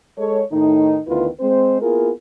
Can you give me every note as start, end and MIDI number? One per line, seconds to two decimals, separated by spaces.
0.18 0.41 56
0.18 0.41 69
0.18 0.41 73
0.51 0.98 45
0.51 0.98 51
0.51 0.98 57
0.51 0.98 63
1.07 1.27 38
1.07 1.27 51
1.07 1.27 59
1.07 1.27 64
1.07 1.27 65
1.07 1.27 71
1.40 1.79 56
1.40 1.79 60
1.40 1.79 72
1.82 2.10 58
1.82 2.10 59
1.82 2.10 64
1.82 2.10 65
1.82 2.10 68
1.82 2.10 70